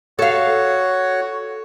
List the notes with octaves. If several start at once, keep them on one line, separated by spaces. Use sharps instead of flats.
F#4 A4 C#5 F5